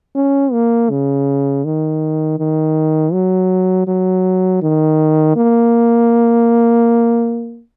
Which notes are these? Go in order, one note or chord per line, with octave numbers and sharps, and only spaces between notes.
C#4
A#3
C#3
D#3
D#3
F#3
F#3
D#3
A#3